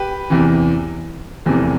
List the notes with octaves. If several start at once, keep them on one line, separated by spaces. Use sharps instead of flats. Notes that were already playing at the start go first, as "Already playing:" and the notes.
Already playing: G4 B4
E2 C3 E3
F1 E2 C3 E3